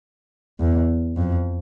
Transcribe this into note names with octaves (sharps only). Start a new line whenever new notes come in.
E2
F2